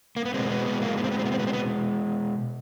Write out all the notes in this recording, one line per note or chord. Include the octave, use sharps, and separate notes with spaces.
A#3
B3
B2 G#3 C4
B3
B3
A#3
B3
C4
B3
C4
B3
C4
B3
C4
B3